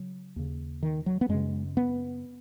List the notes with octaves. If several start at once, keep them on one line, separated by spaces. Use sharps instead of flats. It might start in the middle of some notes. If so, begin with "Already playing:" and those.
Already playing: C#3 F#3
D#2 C#3
D#3
F#3
B3
F#2 C#3 G#3
B3